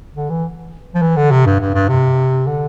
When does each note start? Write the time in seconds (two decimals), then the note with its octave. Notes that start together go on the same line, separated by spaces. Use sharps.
0.16 D3
0.30 E3
0.95 F3
1.02 E3
1.16 D3
1.31 C3
1.46 G2
1.60 G2
1.74 G2
1.88 C3
2.47 D3